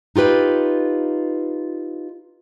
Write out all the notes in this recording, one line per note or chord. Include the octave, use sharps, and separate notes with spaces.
D#4 F4 G4 B4